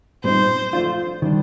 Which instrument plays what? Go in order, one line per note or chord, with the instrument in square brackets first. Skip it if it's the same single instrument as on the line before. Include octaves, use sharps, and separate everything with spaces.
[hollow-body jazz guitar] A#2 G3 C4 D#4 [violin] C5
[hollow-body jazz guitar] F3 A3 D4 F4
D#3 G3 D4